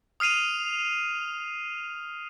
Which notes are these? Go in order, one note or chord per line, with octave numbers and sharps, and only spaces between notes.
D#6 F6 C7 D#7 F7